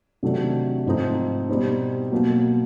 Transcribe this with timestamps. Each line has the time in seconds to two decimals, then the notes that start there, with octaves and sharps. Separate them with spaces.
0.23 C3 D#3 F#3 A3 D4
0.86 G#2 F3 A3 C4 D#4
1.49 B2 G3 C4 D#4
2.11 B2 F#3 A#3